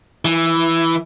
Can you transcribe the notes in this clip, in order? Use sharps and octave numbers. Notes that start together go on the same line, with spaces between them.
E3